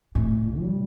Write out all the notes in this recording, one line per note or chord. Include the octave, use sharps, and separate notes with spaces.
A2
G3